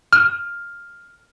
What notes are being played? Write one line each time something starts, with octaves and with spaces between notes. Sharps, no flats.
F6